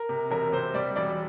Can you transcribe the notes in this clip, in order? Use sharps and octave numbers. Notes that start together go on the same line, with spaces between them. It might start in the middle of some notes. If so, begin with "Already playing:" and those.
Already playing: A#4
C3
E1 A#4
C3 C5
G3 D5
E1 D5